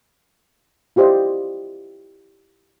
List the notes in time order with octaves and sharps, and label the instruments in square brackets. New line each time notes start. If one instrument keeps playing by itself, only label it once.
[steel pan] E4 F4 G4 C5 D5 D#5